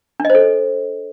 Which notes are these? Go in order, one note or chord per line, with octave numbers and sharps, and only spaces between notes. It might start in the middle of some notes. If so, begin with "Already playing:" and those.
D4
D#5
C5
A4